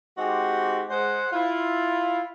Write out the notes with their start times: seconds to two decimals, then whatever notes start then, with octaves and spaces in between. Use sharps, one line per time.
0.18 G#3 C4 D#4 F#4 G4
0.90 G#3 C5 F#5
1.32 E4 F4